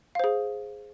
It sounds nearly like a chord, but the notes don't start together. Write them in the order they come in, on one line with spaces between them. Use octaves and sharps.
F5 C5 G#4